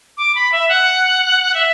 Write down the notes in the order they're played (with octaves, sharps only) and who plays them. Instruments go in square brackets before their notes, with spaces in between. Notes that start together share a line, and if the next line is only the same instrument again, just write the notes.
[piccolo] D6
B5
E5
F#5
E5